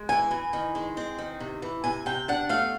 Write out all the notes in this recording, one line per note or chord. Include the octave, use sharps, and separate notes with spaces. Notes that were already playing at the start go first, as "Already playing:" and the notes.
Already playing: G#3
E3 G#5
E3
D#3
G#3
C4
D#3
C3
E3
C3 G#5
C3 G5
D4 F#5
A3 F5